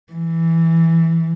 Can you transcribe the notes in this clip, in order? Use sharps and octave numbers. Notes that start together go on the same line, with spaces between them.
E3